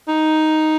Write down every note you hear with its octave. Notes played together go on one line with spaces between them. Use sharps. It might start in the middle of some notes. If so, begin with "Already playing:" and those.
D#4